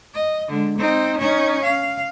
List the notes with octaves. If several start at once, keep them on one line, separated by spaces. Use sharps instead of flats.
D#5
D3 G#3
C4 D#4
C#4 D#4
F5